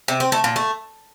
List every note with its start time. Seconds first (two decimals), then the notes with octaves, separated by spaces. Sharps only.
0.08 C3
0.20 C4
0.32 A3
0.44 A#2
0.56 A3